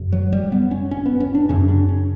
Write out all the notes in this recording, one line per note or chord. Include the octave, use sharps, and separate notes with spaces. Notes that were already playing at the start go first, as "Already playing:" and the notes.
Already playing: F#2 C#3
F#3
G3
B3
C#4
C#4
B3
C#4
D4
F#2 C#3 C#4
D4
C#4